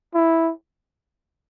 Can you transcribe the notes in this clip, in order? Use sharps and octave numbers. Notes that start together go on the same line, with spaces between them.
E4